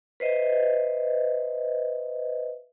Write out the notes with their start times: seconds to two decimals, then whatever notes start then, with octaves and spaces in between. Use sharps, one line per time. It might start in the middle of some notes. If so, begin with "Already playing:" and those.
0.20 B4 C5 D#5 E5